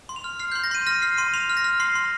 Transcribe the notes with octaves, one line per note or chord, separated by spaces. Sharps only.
C6
F7
F6
F6 C7
C6 G6
A#6
C6 D#7
F6 A#6
F6 C7
C6 D#7
C6 F7
F6
A#6
F6
C6 C7
C6